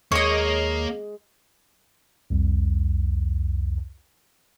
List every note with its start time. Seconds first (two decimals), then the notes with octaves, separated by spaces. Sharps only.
0.12 D#2 G#3 A#3 C#5 D#5
2.30 C2 F2